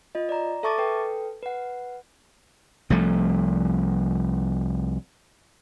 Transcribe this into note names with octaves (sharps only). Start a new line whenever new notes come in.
F4 D#5
D5 A#5
A4 E5 A5 C#6 D6 A6
A4 B4 G5
B4 F#5
C2 F3 A3